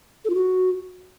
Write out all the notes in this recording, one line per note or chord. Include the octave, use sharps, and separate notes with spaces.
A4
F4
F#4